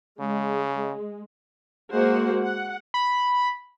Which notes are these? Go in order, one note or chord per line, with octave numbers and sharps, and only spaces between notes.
C#3 G#3
G#3 A#3 F#4 C5 F#5
F#5
B5